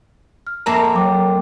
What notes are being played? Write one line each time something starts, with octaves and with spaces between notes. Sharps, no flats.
F6
F2 A#3 A#4 E5 A5 A#5
F#3 G5 D6